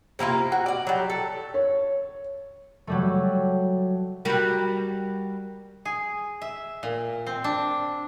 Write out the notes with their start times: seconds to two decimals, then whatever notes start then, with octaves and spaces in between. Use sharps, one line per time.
0.19 C3 A#3 E4 F4
0.52 F#4
0.66 D5 F#5
0.87 F#3 G3
1.10 A4
1.54 C#5
2.87 F#3 G3 A3
4.25 G3 F#4 A#4
5.85 G#4
6.42 E5
6.83 A#2
7.27 C4
7.44 D4